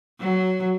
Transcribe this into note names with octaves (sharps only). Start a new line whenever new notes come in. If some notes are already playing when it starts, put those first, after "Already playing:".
F#3